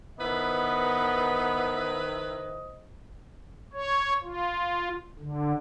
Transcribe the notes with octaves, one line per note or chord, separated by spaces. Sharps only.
D#3 B3 E4 B4 C5 D#5
C#5
F4
D3